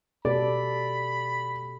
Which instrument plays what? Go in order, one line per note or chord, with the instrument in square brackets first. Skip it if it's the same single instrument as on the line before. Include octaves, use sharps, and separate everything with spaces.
[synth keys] B2 [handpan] G4 A4 [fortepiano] D5 [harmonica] B5